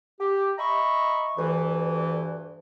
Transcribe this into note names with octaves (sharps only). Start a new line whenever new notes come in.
G4
D#5 E5 A#5 B5 C#6
D2 G2 E3